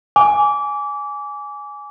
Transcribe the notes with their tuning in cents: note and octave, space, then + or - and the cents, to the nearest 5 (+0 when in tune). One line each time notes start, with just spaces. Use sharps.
G#5 +0 D6 -25